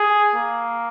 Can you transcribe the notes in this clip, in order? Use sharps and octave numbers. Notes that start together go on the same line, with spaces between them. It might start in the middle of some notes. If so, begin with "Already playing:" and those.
Already playing: G#4
A#3